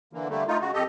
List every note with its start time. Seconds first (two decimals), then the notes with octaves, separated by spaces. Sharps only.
0.13 D3 E3 A#3
0.30 D3 G3 A3 A#3
0.48 A3 D#4 F4
0.61 C#3 G#3 F#4
0.74 F2 G4 A4 D#5